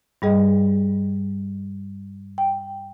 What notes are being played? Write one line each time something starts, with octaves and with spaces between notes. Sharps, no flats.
G2 G3 G#4 D#5
G5